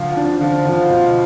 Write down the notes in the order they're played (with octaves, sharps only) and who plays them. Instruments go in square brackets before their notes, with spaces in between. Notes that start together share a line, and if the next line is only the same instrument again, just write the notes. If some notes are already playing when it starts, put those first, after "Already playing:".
Already playing: [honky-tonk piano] D2 [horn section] F3
[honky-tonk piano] D4
[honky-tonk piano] D3 [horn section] F3
[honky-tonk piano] D2
B2